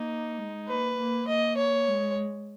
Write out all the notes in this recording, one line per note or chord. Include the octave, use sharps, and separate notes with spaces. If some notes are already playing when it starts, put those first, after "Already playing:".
Already playing: A#3 D#4
G#3
A#3 B4
A#3
A#3 D#5
C#5
G#3